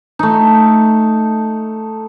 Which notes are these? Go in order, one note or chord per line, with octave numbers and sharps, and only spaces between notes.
A3 D#4